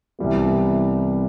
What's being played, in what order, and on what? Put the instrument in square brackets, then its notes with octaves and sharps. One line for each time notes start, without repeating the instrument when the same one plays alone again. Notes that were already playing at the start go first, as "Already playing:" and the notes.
[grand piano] C2 C3 E3 G3 B3